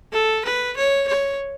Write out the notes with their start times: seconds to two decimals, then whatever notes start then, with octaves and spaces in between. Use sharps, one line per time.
0.13 A4
0.45 B4
0.77 C#5
1.08 C#5